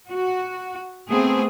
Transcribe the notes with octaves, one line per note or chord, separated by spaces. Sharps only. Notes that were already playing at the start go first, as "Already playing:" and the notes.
F#4
A3 B3 C4 G#4